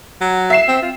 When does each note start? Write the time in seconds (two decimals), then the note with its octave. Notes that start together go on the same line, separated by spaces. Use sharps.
0.21 F#3
0.50 E5 C7 E7
0.68 C4
0.82 F4